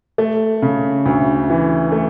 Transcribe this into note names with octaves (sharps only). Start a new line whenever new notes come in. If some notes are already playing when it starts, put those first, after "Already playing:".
A3
C#3
D2
E3
A3